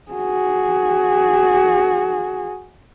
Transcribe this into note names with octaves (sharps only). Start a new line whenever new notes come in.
F#4 G#4